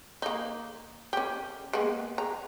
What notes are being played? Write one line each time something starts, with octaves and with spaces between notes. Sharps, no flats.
A#3 D#4
C#4 G4
G#3 A#3 B3
A#5